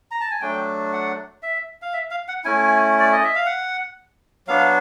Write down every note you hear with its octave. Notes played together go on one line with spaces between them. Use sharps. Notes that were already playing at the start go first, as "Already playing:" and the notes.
A#5
A5
G#5
F#3 A3 D4 G5
F#5
E5
F5
E5
F5
F#5
A3 C#4 E4 G#5
D5
D#5
E5
F5
F#5
F#3 B3 D4 F5